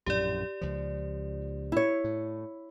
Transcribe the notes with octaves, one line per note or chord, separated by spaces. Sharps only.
A#1 F#2 A2 G4 D5
C#2 F3
E4 C#5
A2